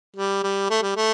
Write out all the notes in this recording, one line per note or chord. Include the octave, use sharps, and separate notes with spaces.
G3
G3
A3
G3
A3